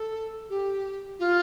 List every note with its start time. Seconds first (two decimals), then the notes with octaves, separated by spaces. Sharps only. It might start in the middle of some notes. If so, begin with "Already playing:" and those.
Already playing: A4
0.50 G4
1.19 F4